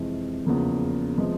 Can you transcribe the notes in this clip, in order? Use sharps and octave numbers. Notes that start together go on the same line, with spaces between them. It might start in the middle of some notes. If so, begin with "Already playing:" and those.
Already playing: F2 C3 E3 G#3
E2 C#3 F3 A#3
C3 F3 G#3 B3